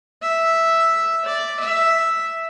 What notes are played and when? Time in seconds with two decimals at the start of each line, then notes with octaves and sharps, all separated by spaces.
0.22 E5
1.25 D5
1.60 E5